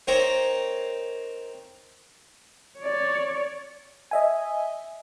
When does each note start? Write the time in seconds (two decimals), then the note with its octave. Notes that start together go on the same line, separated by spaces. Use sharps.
0.07 A#3 C4 D#4 A#4 C5 C#5
2.79 C#5 D5
4.11 D#5 E5 G#5